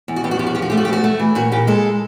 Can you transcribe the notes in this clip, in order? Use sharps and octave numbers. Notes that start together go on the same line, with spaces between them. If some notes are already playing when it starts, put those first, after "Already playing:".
E2
F#4
E2 G4
F#4
F3 G4
F#4
F3 G4
F#4
A3 G4
F#4
G4
E2 F#4
A3
E3
A#2 F#4
A#2 G4
G#3 A4